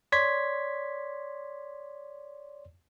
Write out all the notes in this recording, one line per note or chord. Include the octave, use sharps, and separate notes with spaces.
C#5 D5 C6 G#6 B6